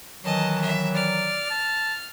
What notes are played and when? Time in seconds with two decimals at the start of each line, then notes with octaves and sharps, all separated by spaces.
0.24 D#3 E3 F#3 D#5 A5
0.61 E5
0.94 D5 F6
1.50 A5